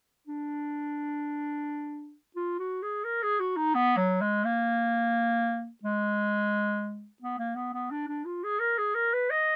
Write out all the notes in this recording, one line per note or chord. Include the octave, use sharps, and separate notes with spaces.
D4
F4
F#4
G#4
A#4
G#4
F#4
D#4
B3
F#3
G#3
A#3
G#3
B3
A#3
B3
B3
D4
D4
F4
G#4
A#4
G#4
A#4
B4
D#5